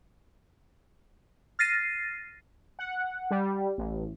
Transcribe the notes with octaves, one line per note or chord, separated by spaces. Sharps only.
F6 A6 A#6 C7 D#7
F#5
G3
A1